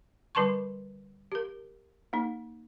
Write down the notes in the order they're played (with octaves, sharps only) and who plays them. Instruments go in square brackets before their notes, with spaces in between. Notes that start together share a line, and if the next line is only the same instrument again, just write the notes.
[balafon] D3 G3 B4 A5 C6 C#6
G4 A#4
A#3 D#4